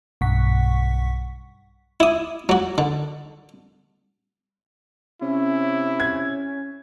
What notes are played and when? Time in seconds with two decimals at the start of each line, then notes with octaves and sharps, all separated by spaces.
0.21 B1 G2 F#5 C#6 B6
2.00 E4 D#6
2.49 F#3 F#4
2.78 D3
5.22 C3 C#4 E4
6.00 G#6